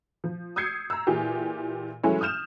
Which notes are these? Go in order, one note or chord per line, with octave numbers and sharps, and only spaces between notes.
F3
D#6 E6 G6 G#6 C7 C#7
A#5 E6
A#2 E3 G4 G#4
E3 F#3 G#3 A3 C#4 E4
D#6 F6 G6 E7